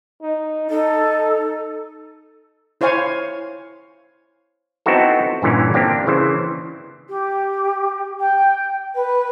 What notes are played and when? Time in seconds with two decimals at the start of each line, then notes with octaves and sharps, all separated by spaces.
0.22 D#4
0.70 D#4 A4
2.81 E4 C5 C#5 F5 G#5
4.86 B3 C4 D#4 E4 F#4 A4
5.42 G2 A#2 D3 E3 C#4
5.74 A#3 C4 D4 G4
6.07 C#3 E3 C5
7.08 G4
8.19 G5
8.95 B4